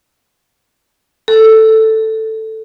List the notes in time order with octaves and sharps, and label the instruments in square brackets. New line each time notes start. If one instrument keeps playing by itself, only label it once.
[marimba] A4